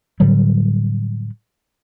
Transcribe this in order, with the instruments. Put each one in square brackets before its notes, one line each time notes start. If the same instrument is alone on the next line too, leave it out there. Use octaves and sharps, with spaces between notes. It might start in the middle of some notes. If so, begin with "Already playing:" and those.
[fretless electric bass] A2 D3 F#3 G3